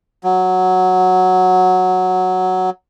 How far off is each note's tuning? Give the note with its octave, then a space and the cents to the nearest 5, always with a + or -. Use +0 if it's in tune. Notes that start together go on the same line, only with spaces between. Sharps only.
F#3 -5